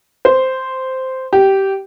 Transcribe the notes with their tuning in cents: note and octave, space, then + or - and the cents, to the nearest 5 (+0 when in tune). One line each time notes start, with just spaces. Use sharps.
C5 -5
G4 -15